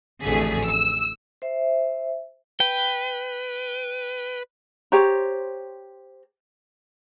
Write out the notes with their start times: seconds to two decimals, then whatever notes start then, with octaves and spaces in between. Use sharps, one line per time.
0.23 A1 F2 D3 A3 G#4 B6
0.66 E6
1.42 C5 E5
2.60 B4 G5
4.92 G4 C5 C#5 A#5